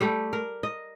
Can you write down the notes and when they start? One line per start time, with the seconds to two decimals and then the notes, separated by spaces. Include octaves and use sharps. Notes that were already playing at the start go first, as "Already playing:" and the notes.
0.01 G3 A3 G4
0.33 A#4
0.63 D#5